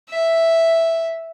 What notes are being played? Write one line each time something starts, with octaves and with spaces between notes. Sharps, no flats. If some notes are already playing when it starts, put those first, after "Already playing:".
E5